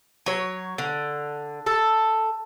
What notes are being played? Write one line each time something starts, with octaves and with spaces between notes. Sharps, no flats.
F#3 C#5
D3
A4